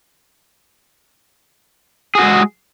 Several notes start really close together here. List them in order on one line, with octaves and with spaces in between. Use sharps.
G#4 F#4 G#3